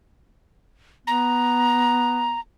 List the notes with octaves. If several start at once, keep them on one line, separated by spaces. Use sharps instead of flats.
B3 A#5